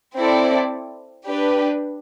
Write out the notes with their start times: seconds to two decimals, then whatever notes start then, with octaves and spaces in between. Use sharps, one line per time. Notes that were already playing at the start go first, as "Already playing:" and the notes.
0.16 C4 E4 A4 D5
1.25 D4 G4 B4